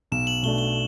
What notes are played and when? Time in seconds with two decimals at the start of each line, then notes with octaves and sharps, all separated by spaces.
0.12 B1 E7
0.27 F#7
0.43 B2 A3 D4 G7
0.58 G7